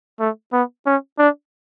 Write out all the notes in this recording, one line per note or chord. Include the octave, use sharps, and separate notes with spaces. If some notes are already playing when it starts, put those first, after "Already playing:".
A3
B3
C#4
D4